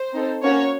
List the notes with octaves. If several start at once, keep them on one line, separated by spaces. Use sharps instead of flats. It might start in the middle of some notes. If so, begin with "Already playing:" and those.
Already playing: C5
C4 D#4 A4
A#3 C#4 F#4 C#5